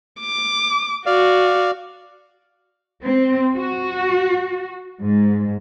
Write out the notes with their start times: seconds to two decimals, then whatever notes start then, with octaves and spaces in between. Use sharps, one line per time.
0.21 D6
1.06 F#4 D5 F5
3.03 C4
3.55 F#4
5.01 G#2